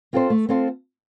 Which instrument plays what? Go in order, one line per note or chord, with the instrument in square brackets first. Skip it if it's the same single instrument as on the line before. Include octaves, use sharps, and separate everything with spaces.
[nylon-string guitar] C4 F4 A4 C5
A3
C4 F4 A4 C5